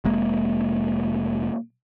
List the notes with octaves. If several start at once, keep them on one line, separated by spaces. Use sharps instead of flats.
F1 G#3 A#3